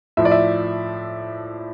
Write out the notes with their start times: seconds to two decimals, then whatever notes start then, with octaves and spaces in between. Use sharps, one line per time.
0.17 A2 F3 E5
0.25 D5
0.32 E5